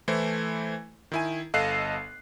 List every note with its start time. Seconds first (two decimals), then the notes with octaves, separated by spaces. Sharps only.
0.08 E3 A3 E4 C5
1.12 D#3 E4 G#5
1.54 G1 A4 D#5 F5 F#6 C7